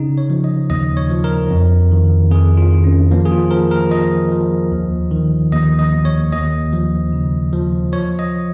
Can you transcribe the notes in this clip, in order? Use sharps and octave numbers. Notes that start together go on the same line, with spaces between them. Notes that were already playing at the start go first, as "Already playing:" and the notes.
Already playing: C#3 D#4
C#5
F3
D#5
D#2 D#5
C#5
F3
A#4
F2
D#3
F2 G#4
F4
D#3
C#4
F3 A#3
G#4
F4
F3 A#4
A#4
F3 D#5
F3
D#2
D#3
D#2 D#5
D#5
D#2
C#5
D#2 D#5
F3
C#3
F3
F3 C#5
D#5